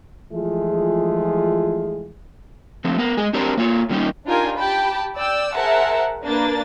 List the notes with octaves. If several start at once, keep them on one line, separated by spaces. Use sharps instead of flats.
E3 F3 G#3 A3 F4 G#4
D3 F3 A3 C4
B3 A#4
G#3 G#4 D#5
C4 D4 G4 A#4 C5 C#5
A#3 F4 C#5
A#2 D#3 G3 G#3 C#4 D#4
D4 D#4 F4 G4 A#4 G#5
G4 G5 A5 B5
D5 G5 E6
G#4 A#4 C5 E5 F#5 A5
A#3 D4 B4 A6